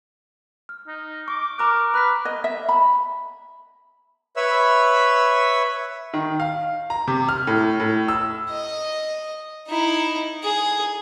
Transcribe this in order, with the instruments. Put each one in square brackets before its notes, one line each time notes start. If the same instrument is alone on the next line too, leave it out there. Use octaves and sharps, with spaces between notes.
[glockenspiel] F6
[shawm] D#4
[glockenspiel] C#6 [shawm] D6
[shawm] A#4 [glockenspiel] A#5 D6 F#6
[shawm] B4 [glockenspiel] B5 F#6 B6
[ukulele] D#5
E5
B5
[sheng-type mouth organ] B4 C#5 E5 B5 E6
[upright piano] D#3
F5
A#5
C3
F6
A2
A2
E6
[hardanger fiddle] D#5
D#4 E4
G#4